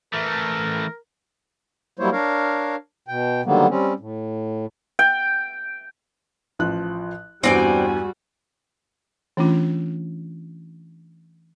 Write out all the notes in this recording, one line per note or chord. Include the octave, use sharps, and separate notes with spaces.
E3 A3 A#4
F#3 G3 A#3 E4 C5 C#5
D4 A#4 C#5 F5
B2 G5
D3 D#3 F#3 G3 A#3 B3
G3 C4 C#4
A2
G5
A1 F3 F#6
E2 G2 G3 C4 F#4 D5 G5 G#5
E3 A3 C#4 D4 F4